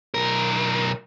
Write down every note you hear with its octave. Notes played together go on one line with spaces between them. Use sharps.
B1 A#4